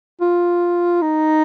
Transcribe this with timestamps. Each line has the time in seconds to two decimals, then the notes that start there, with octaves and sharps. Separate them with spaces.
0.21 F4
1.02 D#4